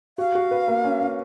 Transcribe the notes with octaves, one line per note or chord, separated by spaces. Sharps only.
F#4 F5
F#4
B4
A#3
C#4
C#4